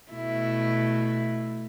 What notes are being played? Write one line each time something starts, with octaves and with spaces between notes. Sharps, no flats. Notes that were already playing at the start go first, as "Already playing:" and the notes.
B2 A3 E4